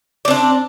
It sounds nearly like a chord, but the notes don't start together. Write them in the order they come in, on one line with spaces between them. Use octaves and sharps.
D5 C4 D4